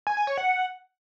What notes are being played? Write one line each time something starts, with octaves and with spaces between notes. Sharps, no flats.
G#5
G#5
C#5
F#5